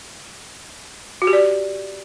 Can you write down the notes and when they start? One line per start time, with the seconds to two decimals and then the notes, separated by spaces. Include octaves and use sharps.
1.22 F#4
1.27 G4
1.33 D5